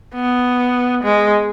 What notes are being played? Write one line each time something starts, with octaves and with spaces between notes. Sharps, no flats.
B3
G#3